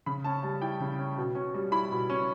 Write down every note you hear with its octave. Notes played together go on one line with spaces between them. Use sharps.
C#3 B5
C#4 A5
G3 A5
E4 G5
C#3
C#4
B2
C#4
G3
E4 B5
B2
C#4